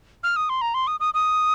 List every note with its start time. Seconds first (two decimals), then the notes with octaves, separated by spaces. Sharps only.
0.24 F6
0.36 D#6
0.49 C6
0.61 A#5
0.74 C6
0.87 D#6
1.00 D#6
1.14 D#6